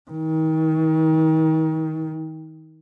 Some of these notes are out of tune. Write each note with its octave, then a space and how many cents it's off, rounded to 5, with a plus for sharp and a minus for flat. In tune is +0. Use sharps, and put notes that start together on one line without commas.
D#3 +35